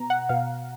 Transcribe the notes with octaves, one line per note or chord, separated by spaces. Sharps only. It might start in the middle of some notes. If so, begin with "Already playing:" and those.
Already playing: B2 A#5
F#5
B2 F5